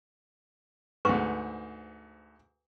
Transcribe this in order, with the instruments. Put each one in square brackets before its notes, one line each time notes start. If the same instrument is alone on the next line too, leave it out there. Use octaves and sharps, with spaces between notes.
[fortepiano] D2 G#2 [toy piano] B4 C#6